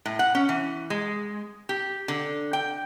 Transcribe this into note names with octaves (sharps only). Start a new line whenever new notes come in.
A2
F#5
C#4
E3
G#3
G4
D3
G5